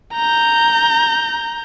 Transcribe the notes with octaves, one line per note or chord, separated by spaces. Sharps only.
A#5 G6